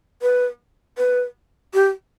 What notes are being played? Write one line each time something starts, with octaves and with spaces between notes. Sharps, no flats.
B4
B4
G4